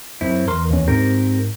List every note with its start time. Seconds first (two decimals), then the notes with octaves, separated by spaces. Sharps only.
0.21 F#2 C4 E4
0.48 E2 A#4 C6
0.70 D#2 C#4
0.88 G#2 C4 G4 A#4